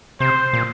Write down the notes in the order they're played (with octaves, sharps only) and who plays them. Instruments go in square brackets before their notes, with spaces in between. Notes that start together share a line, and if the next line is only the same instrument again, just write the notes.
[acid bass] C3 [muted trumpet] C5
[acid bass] A#2